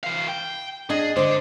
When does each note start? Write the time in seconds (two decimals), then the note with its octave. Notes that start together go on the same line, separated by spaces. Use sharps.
0.04 E3 F5
0.28 G5
0.90 D4 G#4 D#5
1.16 D3 C5 D#5